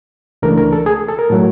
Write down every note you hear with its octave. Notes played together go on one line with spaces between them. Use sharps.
C#2 C#3 E3 A3 D4 A#4
A#4
A4
G#4
A4
A#4
A2 F#3 A3